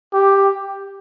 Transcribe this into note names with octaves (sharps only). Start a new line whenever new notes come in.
G4